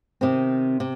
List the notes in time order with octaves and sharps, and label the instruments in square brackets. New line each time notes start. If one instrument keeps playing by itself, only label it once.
[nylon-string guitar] C3 D#3 C4
C3